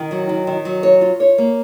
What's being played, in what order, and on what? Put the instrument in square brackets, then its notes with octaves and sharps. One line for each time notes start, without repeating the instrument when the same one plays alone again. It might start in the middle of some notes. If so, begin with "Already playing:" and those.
Already playing: [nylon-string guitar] D#3
F#3
D#3
D#3
F#3
C#5
F4
C#5
A#3